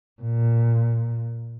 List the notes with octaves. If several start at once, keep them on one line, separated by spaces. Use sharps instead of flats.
A#2